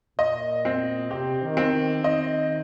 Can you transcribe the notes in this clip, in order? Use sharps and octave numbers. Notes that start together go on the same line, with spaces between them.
A#2 D#5
C4
C3 G4
D#3
C4
D#3
D#3 D#5